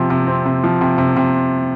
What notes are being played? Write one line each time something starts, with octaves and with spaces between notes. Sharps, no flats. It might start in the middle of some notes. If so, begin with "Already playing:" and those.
Already playing: C3 F3 C4
C3
C4
C3
F3
C3
C3
C3